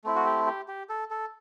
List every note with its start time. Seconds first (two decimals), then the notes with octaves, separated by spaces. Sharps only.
0.04 A3 C4 E4
0.16 F#4
0.26 G4
0.46 G4
0.68 G4
0.89 A4
1.11 A4